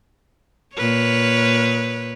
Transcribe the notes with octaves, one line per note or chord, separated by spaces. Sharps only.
A#2 B4 C#5